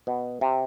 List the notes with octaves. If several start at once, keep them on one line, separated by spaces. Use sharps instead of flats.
B2
C3